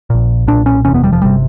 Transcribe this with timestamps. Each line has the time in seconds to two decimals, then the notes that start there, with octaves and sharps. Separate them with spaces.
0.10 A#1 A#2
0.47 B1 A#2 D4
0.66 C#4
0.85 F#1 E2 C3 C#4
0.94 B3
1.04 G3
1.12 F3
1.22 G1 C3 G3